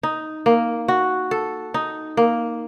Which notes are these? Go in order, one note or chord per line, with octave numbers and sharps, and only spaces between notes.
D#4
A#3
F#4
A4
D#4
A#3